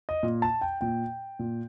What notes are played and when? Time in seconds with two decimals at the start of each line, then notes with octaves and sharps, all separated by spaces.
0.09 D#5
0.23 A#2
0.42 A5
0.61 G5
0.81 A#2 G5
1.39 A#2